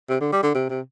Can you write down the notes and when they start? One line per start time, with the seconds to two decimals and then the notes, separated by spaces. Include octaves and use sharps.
0.09 C3
0.21 D3
0.32 G3
0.43 D3
0.54 C3
0.70 C3